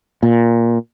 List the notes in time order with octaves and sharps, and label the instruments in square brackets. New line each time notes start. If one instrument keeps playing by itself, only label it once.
[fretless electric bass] A#2